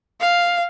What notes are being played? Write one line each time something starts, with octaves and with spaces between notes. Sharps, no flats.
F5